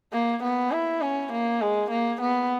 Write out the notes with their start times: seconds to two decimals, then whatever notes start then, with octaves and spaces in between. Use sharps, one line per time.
0.13 A#3
0.43 B3
0.72 E4
1.01 C#4
1.32 A#3
1.61 G#3
1.90 A#3
2.21 B3